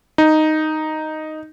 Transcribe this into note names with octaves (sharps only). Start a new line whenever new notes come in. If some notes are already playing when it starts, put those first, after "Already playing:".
D#4